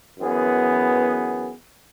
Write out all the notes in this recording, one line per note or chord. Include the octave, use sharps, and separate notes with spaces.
F#2 E3 B3 G#4